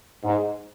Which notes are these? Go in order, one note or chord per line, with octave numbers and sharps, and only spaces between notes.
G#2